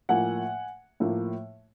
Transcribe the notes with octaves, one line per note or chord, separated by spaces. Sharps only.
A2 F3 A#3 F#5 G#5
A2 F3 A#3